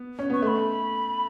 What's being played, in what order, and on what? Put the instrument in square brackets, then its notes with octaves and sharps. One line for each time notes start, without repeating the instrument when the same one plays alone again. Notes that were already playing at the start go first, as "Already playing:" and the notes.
Already playing: [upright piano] B3
C#4
[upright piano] B3 [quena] C#6
[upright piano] A3 [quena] C#6
[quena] B5